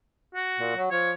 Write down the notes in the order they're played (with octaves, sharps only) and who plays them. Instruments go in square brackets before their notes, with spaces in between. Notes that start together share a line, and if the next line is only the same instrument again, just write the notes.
[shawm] F#4
[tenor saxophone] A#2
F#3
[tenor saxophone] F3 [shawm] C#5